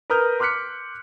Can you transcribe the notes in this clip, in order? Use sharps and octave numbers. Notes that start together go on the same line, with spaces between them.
A#4 B4 A#5 D#6 F6 G6
C6 D6 F6 F#6 B6 C#7